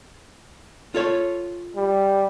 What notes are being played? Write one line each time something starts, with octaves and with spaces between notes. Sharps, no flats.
F4 A4 C#5
G3